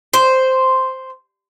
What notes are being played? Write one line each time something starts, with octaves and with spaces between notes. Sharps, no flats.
C5